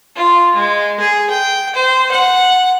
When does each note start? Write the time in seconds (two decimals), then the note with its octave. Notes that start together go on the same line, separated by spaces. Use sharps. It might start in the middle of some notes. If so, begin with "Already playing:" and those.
0.16 F4
0.55 G#3
0.99 G#4
1.30 G5
1.75 C5
2.11 F#5